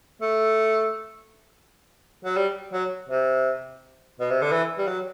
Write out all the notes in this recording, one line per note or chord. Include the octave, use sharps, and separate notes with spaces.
A3
F#3
G3
F#3
C3
B2
C3
D3
E3
G3
F#3